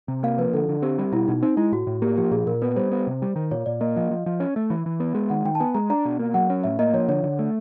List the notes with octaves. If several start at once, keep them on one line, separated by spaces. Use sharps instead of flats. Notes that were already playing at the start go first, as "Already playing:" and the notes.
C3
A#3 F5
F3 B4
D3 A4
D3
C4 G4
G3
B2 E4
B2 D#4
C4 D#4
G#3 E4
A2 F#4
A2
A#3 G4
F3 G4
A#2 G#4
A#2 A#4
B3 B4
G3 C5
B3
C3
G3
D#3
A#2 C#5
A#2 D5
A#3 D#5
F3 D#5
F3
F3
C#4
A3 E5
E3
E3
B3
G#3
D#3 F#5
D#3 G5
A5
B3 G#5
G#3 A#5
D4 A#5
B2
A#3
F#3 F#5
C#4
A2 E5
A#3 D#5
F3 C#5
D3 C#5
D3
A3